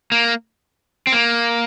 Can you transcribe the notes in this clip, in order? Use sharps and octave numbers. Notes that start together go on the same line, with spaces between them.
A#3
C4
A#3